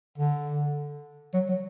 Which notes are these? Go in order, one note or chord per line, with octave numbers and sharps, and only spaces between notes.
D3
F#3
F#3